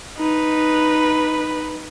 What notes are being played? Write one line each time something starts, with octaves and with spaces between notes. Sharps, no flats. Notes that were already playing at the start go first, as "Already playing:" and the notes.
D#4 B4